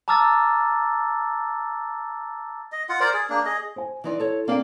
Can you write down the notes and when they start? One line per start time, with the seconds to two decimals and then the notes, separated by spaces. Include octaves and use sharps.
0.08 A5 A#5 D6 E6 F6 A6
2.72 D#5
2.89 F4 F#5
3.00 A#4 C5 D5
3.14 G#4
3.30 A#3 D4
3.46 G#4 D#5
3.76 C5 G#5
4.04 E3 D#4 E4 D5 C6
4.20 A4 C#5
4.48 A#3 C4 D4 F5 G5